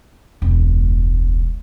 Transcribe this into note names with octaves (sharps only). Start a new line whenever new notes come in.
E1 C#2